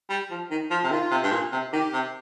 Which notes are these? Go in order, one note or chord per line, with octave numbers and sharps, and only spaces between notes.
G3
F3
D#3
F3
C3
D#3 F4
C3
G2
A#2
C3
D#3 G4
C3